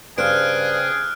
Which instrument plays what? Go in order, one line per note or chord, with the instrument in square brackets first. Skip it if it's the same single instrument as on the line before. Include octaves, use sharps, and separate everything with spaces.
[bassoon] G2 [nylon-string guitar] C#3 C5 [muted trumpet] G#4 [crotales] F6 F#6 D7